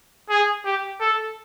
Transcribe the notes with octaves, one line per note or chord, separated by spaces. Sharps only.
G#4
G4
A4